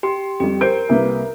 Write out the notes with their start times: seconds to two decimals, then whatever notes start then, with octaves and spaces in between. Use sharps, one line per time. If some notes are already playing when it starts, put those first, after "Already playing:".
0.03 G4 C6
0.40 F2 G3 G4
0.61 A#4 C5 G6 D7
0.89 C2 A#3 B4